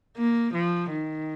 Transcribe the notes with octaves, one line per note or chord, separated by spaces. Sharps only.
A#3
F3
D#3